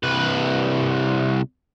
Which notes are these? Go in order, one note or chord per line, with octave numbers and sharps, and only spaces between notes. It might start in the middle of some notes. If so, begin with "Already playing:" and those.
C2 B4